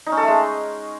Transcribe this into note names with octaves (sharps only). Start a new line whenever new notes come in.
D#4
C#4
A4
A3
G#3